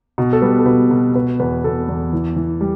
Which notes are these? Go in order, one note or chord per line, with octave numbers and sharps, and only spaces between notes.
B2
A4
G3 B4
A4
B2 B4
B2
B2 B4
E2 B4
B2 A4
E2
E3
E3
G3